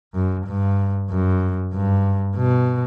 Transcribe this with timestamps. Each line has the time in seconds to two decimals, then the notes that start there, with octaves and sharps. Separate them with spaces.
0.14 F#2
0.47 G2
1.10 F#2
1.73 G2
2.36 B2